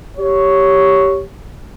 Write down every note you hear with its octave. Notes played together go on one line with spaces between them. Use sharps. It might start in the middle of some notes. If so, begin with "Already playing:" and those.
G4 C#5